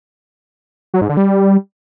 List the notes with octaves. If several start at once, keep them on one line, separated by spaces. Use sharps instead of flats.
F#3
G#2
D3
G3